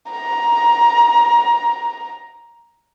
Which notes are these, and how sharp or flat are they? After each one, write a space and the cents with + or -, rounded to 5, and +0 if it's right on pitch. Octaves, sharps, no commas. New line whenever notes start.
A#5 +15